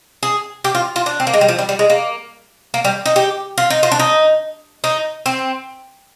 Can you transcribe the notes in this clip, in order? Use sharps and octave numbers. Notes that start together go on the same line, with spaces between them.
G#4
G4
F4
F4
D4
C4
A#3
G#3
G3
F3
G3
G3
G#3
A#3
A#3
G3
D#4
G4
F4
D#4
F4
D4
D#4
D#4
C4